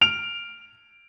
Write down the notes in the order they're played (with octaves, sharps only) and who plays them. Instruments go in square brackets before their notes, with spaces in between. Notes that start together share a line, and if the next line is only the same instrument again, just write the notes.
[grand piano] F6 D7 F7